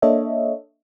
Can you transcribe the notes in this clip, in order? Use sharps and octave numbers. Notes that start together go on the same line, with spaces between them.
A#3 D4 A4 C#5 D#5 E5